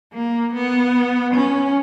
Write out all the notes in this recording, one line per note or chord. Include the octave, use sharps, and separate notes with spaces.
A#3
B3
C#4